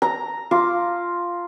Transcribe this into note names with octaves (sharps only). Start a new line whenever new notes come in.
A#5
F4 D6